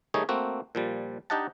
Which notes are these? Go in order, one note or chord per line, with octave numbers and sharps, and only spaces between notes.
D#3 G3 A3 D#4 G#4 C#5
A3 A#3 C4 F#4
A#2 F3 G3
D4 D#4 G4 D#5 F#5 A5